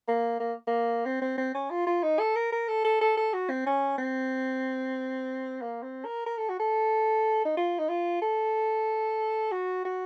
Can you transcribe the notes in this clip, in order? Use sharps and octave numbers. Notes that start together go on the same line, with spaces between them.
A#3
A#3
A#3
C4
C4
C4
C#4
F4
F4
D#4
A4
A#4
A#4
A4
A4
A4
A4
F#4
C4
C#4
C4
A#3
C4
A#4
A#4
A4
F#4
A4
D#4
F4
D#4
F4
A4
F#4
F#4